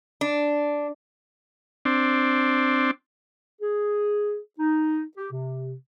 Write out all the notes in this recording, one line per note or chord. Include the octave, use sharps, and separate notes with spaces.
D4
C4 D4
G#4
D#4
G4
C3